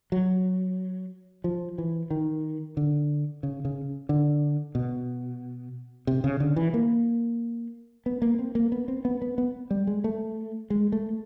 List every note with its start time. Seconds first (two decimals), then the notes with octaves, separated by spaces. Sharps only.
0.12 F#3
1.44 F3
1.78 E3
2.11 D#3
2.77 D3
3.43 C#3
3.65 C#3
4.09 D3
4.75 B2
6.07 C3
6.24 C#3
6.40 D3
6.56 E3
6.74 A#3
8.06 B3
8.22 A#3
8.39 C4
8.55 A#3
8.72 B3
8.88 C4
9.05 B3
9.22 B3
9.38 B3
9.71 G3
9.87 G#3
10.04 A3
10.70 G#3
10.92 A3